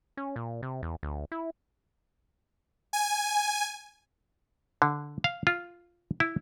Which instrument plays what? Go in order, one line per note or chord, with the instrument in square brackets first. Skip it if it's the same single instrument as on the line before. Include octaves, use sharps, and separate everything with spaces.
[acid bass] C#4
A#2
C3
E2
D2
E4
[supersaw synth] G#5
[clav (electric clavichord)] D3
F5
F4
E4